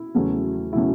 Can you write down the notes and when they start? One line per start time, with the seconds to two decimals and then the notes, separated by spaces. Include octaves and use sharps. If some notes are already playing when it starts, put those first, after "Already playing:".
Already playing: E4
0.14 E2 C#3 F#3 A3 C#4
0.73 C#3 F#3 A3 C#4 E4